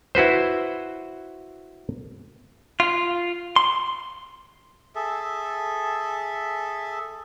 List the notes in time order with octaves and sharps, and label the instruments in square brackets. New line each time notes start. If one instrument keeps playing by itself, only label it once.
[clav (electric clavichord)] E4 F#4 B4 C5
[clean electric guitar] F4
C6
[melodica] G#4 A4 E5